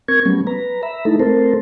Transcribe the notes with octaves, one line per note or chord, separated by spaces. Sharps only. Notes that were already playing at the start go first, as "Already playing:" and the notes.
C4 A#4 C#6 G#6
F#3 G3 A3 B3 C#4
B4 A#5
E5 A#5 B5
A3 D#4 E4 A4
A3 C4 A4 A#4 C5